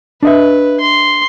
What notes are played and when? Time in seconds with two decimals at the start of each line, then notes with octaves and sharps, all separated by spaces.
0.23 D4 B4 D#5 E5
0.80 C6